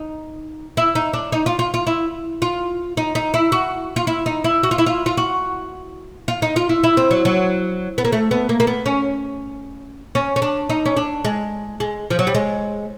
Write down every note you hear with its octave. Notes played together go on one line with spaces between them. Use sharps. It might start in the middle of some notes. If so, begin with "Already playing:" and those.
Already playing: D#4
E4
D#4
D4
D#4
F4
F4
F4
E4
F4
D#4
D#4
E4
F#4
F4
E4
D#4
E4
F#4
F4
E4
F4
F4
F#4
F4
D#4
F4
E4
E4
C4
F#3
F#3
B3
A#3
A3
B3
A#3
A#3
B3
C#4
C#4
C#4
D4
D#4
C#4
D4
G#3
G#3
F3
F#3
G3
G#3